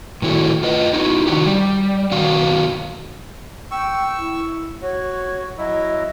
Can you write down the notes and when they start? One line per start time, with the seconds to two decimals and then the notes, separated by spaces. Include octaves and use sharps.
0.22 A2 D#3 E4 F#4 A4
0.63 F4 B4 D#5
0.93 D#4 E4 F#4
1.27 D3 D#3 E4 F#4 G4
1.46 G3
2.12 B2 D#3 F#3 F#4 F5
3.71 G5 C#6 E6
4.18 E4
4.82 F#4 C#5
5.58 F#3 E4 D#5